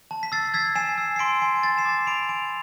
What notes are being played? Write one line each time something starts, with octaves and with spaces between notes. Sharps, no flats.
A5
B6
E6 A6 C7
E6 G#6 B6
G#5 C7 E7
E6
C7
C6 B6 D7
G#5
G#5 A6 C7
C7 E7
D6
B5 D7 F7
G#5 D7 F7
F7